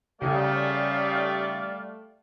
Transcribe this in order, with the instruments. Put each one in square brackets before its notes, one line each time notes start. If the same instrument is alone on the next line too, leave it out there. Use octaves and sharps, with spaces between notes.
[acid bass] C#3 [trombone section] G3 A3 [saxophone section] C#4 D#4 G4 [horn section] D5 F5